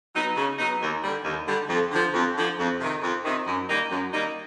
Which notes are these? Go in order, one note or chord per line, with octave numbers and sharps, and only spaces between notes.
F#3 B3 D#4
C#3
F#3 B3 D#4
D#2
D3 G3
D#2
D3 G3
F2
D3 F3
F2
D3 F3
F2
C3 D#3
F2
C3 D#3
F#2
D#3 G3 A#3 D#4
F#2
D#3 G3 A#3 D#4